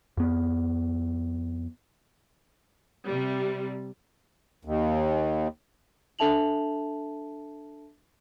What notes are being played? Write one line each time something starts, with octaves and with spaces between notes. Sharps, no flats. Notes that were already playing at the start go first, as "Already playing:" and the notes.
F2 B3
C3 G3
D#2
D4 A4 E5 A5 F7 F#7